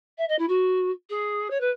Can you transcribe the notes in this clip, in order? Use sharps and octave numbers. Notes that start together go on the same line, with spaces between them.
E5
D#5
E4
F#4
G#4
C#5
B4